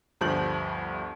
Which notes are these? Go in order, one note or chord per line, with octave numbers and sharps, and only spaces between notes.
G1 D2 G2 F3 G6 F#7